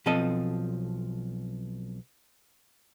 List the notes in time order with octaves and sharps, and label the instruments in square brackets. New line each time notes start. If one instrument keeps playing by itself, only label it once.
[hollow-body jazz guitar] B1 F3 C4 A4 D#5 A5